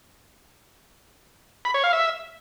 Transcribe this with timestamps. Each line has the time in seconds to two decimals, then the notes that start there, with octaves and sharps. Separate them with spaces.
1.65 B5
1.74 C#5
1.84 F5
1.93 E5